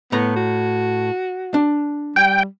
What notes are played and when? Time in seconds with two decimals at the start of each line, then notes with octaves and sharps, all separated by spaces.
0.12 A2 B3 A#5
0.36 F#4
1.54 D4
2.16 G3 G5